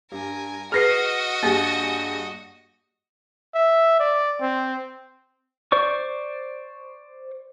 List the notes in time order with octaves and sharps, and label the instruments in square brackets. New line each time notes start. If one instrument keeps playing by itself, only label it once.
[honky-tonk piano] G2 [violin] A#4 G#5
[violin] F#4 D#5 [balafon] G#4 B4 [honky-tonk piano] F6 A#6 C7
[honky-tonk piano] G2 G4 G#4 [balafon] A#3
[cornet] E5
D5
C4
[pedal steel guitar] C5 D5 C#6